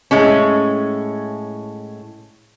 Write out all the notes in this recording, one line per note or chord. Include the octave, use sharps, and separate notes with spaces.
A2 G#3 C#4